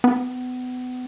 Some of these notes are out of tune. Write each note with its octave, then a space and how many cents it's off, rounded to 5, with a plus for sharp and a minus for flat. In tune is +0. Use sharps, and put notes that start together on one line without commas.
B3 +30